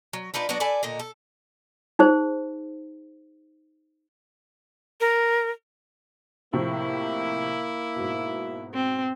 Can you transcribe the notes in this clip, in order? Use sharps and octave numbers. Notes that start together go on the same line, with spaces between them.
F#3
D4 D#4 F4 B4
F#3 B3 D4 F#4
A4 B4 D5 G#5
A#2 D3 D#4
A4
D#4 G#4 C5
A#4
A2 C3 F3 A#3 E4
G#2 B2
C4